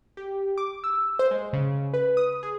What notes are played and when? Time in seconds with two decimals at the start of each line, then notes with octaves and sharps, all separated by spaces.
0.17 G4
0.58 D6
0.84 E6
1.19 C5
1.31 G#3
1.53 C#3
1.94 B4
2.17 D#6
2.43 G#4